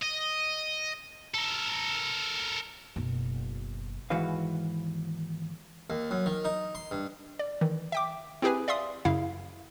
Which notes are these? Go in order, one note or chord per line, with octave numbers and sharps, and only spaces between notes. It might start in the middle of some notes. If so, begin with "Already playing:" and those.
D#5
A4 A#4
F#1 B2
D#2 G#2 E3 F#4 B4 F5
D#2
F#2
D#3
D#4
C6
G2
D5
D#3 E3
E5 G5 D6
C4 E4 G4 G#4 B4 G#5
D5 E5 F5 C6 D#6
F#2 C#3 E4 F5